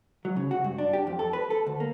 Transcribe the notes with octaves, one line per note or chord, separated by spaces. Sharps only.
F#3
C#3
F#4
G2
D4
G4
F2
A4
B4
A4
D2
A#3